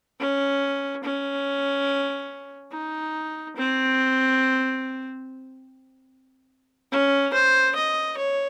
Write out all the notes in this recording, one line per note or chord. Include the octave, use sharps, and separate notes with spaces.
C#4
C#4
D#4
C4
C#4
C5
D#5
C#5